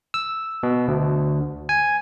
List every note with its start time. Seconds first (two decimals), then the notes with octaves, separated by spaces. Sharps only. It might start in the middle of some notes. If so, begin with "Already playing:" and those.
0.14 E6
0.63 B2
0.88 D2
1.69 G#5